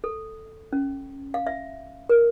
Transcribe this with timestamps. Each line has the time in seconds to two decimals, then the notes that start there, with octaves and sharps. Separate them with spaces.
0.04 A4
0.73 C#4
1.34 F5
1.47 E5
2.09 A#4